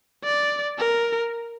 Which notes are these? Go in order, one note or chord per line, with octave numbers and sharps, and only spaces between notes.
D5
A#4